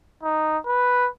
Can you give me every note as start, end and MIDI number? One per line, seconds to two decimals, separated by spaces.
0.23 0.58 63
0.66 1.08 71